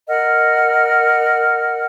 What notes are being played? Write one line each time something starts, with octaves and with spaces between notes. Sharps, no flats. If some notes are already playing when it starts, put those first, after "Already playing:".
A#4 D#5 F#5 F6